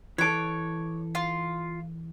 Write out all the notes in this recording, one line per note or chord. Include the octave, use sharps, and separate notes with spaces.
E3 A4 C#5 D6
F4